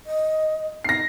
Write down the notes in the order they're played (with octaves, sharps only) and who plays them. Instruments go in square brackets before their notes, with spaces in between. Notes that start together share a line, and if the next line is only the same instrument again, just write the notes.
[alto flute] D#5
[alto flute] D#4 [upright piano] A#6 C7